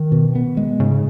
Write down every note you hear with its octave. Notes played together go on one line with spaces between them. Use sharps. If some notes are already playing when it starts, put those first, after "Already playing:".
Already playing: D#3
B2
B3
G#3
G#2 C#3